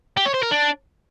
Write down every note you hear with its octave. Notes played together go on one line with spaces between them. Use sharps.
G4
C#5
C5
A#4
D4